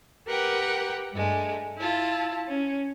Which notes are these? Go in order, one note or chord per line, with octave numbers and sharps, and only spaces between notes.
G4 A#4 B4 F#5 G5
G2 G#3 A3
E4 F4 A5
C#4